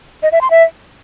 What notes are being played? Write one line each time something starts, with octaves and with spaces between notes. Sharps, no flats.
D#5
E5
C6
E5